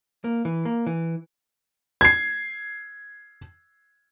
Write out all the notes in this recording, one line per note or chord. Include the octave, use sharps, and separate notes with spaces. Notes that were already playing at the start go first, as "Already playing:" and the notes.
A#3
E3
A#3
E3
G#6 C7